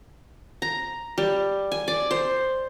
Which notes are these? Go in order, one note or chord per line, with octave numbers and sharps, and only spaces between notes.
A#5
G3
G#5
D5
C5